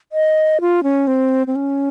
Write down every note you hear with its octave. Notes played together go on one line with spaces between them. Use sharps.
D#5
F4
C#4
C4
C4
C#4